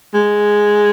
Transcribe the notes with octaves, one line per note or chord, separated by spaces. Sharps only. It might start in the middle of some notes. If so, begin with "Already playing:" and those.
G#3